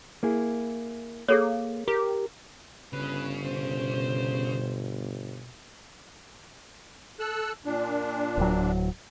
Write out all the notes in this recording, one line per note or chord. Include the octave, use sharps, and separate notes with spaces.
A#3 E4 G#4
A#3 G#4 A4 C#5
G4 A#4
G1 C#3 B4
B2 C5
A4 E6 F#6
A#2 D4
D1 F#3